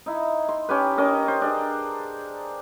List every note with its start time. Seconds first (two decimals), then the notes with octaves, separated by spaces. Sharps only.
0.06 D#4 E4
0.49 C6
0.69 C#4 G4 B4
0.97 C#4 A#4 D#5
1.28 C5
1.42 D4 G#4